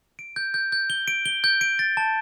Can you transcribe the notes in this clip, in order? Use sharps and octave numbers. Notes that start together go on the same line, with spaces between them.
D7
G6
G6
G6
G7
D7
G7
G6
D7
A6
A5